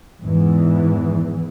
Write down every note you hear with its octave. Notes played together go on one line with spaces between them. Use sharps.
E2 G#2 E3